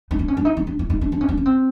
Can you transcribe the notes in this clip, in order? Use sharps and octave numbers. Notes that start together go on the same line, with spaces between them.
D#4
D4
C#4
D4
D#4
D#4
D4
E4
D#4
D4
D4
C#4
D4
C#4
C4